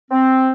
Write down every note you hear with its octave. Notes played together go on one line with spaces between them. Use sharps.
C4